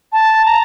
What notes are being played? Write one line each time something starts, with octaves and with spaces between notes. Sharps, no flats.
A5
A#5